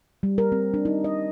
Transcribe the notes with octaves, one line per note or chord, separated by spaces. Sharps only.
G3
A#4
C4
D4
D#4
D#5